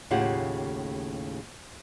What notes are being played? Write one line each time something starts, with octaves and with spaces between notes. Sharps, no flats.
D#2 A2 C#3 F4 G4 F#5